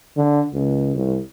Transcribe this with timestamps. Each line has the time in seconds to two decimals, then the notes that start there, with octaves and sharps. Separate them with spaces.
0.17 D3
0.53 C#2
0.95 C2